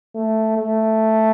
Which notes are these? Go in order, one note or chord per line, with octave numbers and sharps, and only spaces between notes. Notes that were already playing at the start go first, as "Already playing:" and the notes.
A3
A3